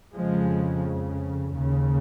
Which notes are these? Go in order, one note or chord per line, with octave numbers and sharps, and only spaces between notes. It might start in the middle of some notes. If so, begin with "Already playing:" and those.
F2 C#3 F3 G#3
D#2 C#3